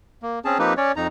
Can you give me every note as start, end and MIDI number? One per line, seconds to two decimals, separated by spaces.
0.22 0.39 58
0.45 0.58 60
0.45 0.58 61
0.45 0.58 68
0.45 0.58 81
0.59 0.74 53
0.59 0.74 58
0.59 0.74 60
0.59 0.74 63
0.59 0.74 67
0.59 0.74 71
0.77 0.92 61
0.77 0.92 73
0.77 0.92 74
0.96 1.07 41
0.96 1.07 63
0.96 1.07 82